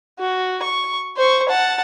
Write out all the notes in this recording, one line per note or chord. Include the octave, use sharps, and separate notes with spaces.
F#4
C#6
C5 C#6
F#5 A5